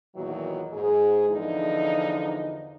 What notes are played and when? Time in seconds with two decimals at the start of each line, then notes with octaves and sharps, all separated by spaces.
0.15 E2 A#2 D#3 F#3 F#4
0.73 G#2 G#4
1.29 E2 D3 F3 D#4